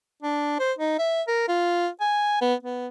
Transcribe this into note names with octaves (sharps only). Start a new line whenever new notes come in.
D4
C5
D#4
E5
A#4
F4
G#5
B3
B3